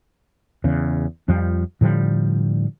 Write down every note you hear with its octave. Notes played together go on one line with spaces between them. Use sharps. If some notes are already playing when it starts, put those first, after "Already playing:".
E2 C#3
F2 F3 G3
A2 D3 F3 G3